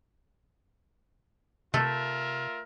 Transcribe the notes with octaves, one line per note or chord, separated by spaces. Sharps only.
C3 A3 F4 A#4 E5